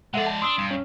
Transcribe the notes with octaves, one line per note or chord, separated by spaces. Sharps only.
G#3 A4 D5 E5 F#5
A5
D4 C6 D#6 E6
G2
C#4